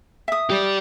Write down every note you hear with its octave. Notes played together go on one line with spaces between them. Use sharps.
E5 D#6
G4 D5